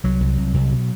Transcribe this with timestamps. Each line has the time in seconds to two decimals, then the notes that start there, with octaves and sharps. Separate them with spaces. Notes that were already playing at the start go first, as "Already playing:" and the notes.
0.04 C2 F#3
0.20 C2
0.37 C2
0.54 C2
0.70 B2